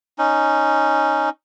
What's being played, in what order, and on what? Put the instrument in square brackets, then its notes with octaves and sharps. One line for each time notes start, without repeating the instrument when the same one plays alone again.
[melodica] C#4 D#4